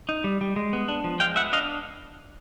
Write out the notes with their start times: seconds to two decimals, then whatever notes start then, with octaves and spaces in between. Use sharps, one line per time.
0.09 D#4
0.24 G3
0.41 G3
0.56 G#3
0.73 B3
0.88 D4
1.04 F3
1.20 G#3 F5 G5
1.36 B3 E5 F#5
1.53 D4 D#5 F5